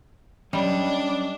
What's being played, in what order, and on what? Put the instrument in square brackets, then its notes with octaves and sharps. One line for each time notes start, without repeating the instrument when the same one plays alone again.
[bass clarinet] F#3 [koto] G3 [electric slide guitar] C#4 D#5 [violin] D4